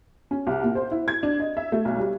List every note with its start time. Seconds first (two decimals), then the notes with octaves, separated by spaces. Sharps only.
0.31 C#4
0.47 C2
0.64 A#2
0.75 C5
0.91 E4
1.08 G#6
1.23 D4
1.40 D#5
1.57 E5
1.72 A3
1.85 B1
1.98 G3